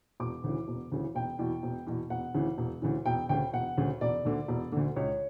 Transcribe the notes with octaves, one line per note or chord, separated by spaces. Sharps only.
E1 D6
D2 C#3 E3
E1
D2 C#3 E3
E1 G5
E2 B2
E1
E2 B2
E1 F#5
D2 C#3 E3
E1
D2 C#3 E3
E1 G5
D2 C#3 G5
E1 F#5
D2 C#3
E1 D5
D2 D3
E1
D2 D3
C#2 C#5